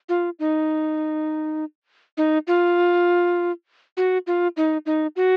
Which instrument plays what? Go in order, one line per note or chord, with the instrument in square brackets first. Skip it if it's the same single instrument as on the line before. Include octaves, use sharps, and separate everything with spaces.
[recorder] F4
D#4
D#4
F4
F#4
F4
D#4
D#4
F#4